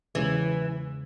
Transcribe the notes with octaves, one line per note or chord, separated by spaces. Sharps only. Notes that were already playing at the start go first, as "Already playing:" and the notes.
E2 C#3 E3 G#3